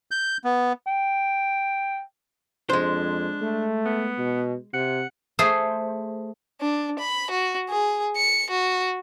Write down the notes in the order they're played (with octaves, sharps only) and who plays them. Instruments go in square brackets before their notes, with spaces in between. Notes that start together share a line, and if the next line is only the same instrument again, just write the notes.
[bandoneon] G6
B3
[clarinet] G5
[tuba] F2 [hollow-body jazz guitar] G#3 C5 [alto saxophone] D4
[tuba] A3
[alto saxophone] B3
[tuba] B2
[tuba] C3 [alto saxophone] F#5
[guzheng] A3 G#4 A4 C5
[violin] D4
B5
F#4
G#4
C#7
F#4